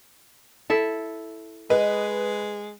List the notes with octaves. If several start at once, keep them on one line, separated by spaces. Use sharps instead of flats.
E4 A4 E5
G#3 B4 D#5